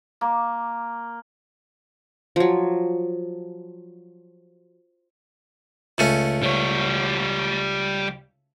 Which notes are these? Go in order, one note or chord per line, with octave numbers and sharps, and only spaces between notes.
A#3
F3 F#3
C#2 A3 C#4
G3 C#5